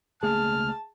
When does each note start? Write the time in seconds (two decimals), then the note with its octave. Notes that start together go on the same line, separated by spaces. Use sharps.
0.23 C#2 A3 A#3 G#4 A5 F6